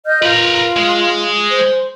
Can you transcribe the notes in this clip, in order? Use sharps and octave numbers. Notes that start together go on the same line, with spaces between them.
D#5 F6 G6
F4 A#4 B4
G#3
C5